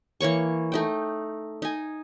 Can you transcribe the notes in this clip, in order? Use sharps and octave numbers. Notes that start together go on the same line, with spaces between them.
E3 A#3 C#5 C#6
A3 D#4 G5
D#4 G#5